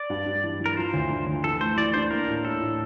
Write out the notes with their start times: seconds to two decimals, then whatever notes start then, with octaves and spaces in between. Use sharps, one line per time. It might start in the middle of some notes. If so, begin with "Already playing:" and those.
Already playing: D5
0.10 G2
0.26 G2
0.44 E3
0.60 E3
0.66 A#4
0.77 F3 C5
0.94 D2
1.10 D3
1.27 D2
1.44 E3 A4
1.61 A3 C5
1.77 E3 D5
1.94 D4 C5
2.10 A#3 A#4
2.28 A2
2.44 A2 A4
2.60 A2